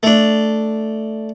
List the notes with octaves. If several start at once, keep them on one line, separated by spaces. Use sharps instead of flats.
A3 D4